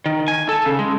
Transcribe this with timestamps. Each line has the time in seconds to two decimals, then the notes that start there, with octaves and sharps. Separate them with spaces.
0.06 D#3
0.28 G#5
0.49 A4
0.66 C#3
0.79 G#3